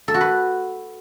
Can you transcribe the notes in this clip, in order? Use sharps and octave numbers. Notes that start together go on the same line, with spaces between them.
A4
F#4
B4